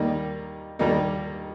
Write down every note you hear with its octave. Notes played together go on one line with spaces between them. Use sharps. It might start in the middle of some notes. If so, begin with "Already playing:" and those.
Already playing: D#2 D#3 G3 A#3 D#4
D#2 D#3 G3 A#3 D#4